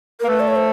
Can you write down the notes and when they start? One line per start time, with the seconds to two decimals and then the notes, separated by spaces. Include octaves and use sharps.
0.20 A#4
0.23 A#3
0.27 A3 B4
0.40 D5
0.48 C#5
0.56 C5